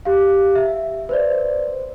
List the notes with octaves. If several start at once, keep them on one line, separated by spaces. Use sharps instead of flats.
G4 F5
E5
B4 C5 D5